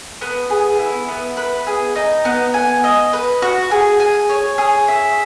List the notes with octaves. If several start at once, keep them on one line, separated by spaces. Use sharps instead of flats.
B3
G#4
E4
B3
B4
G#4
D#4
B3
G#5
D#5
B4
F#4
G#4
G#5
C#5
G#4
E5